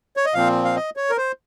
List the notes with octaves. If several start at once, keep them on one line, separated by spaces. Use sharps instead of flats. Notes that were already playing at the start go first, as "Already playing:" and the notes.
C#5
D#5
A#2 F3 C4 F5
F5
D#5
C#5
A#4
C5